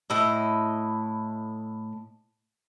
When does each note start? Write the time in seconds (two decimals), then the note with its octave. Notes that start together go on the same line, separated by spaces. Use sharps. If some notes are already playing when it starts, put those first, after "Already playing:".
0.10 A2 E4 D#5